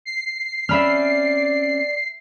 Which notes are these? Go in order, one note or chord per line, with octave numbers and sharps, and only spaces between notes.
C7
C4 C#4 D5 E5 B5 F6